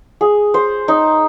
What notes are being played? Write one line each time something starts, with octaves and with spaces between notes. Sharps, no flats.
G#4
C5
D#4